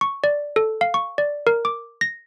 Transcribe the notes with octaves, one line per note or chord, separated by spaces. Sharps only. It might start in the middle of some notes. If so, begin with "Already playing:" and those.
C#6
D5
A4
F5
C#6
D5
A#4
D6
A#6